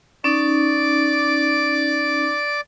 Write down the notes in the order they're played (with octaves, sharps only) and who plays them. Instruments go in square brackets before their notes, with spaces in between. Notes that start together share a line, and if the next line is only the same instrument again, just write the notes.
[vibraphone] C#4 D#4 [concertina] D5 D6